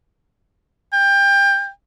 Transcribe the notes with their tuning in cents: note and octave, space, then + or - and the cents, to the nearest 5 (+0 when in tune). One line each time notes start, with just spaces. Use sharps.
G5 +25